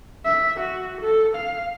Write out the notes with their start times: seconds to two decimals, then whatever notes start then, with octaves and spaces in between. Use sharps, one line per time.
0.25 E5
0.59 F#4
1.01 A4
1.36 F5